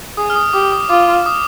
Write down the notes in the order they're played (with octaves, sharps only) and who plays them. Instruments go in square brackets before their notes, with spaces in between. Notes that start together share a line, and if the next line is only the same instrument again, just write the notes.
[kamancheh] G#4 [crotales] D#6
[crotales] F6
D#6
[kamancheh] G4 [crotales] D6
[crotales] D#6
[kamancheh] F4 [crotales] D6
[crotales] D#6